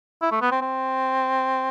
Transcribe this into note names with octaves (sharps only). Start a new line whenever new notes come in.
E4
A3
B3
C4
C4